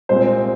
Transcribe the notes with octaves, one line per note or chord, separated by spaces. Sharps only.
C2 A#2 G#3 C4 C5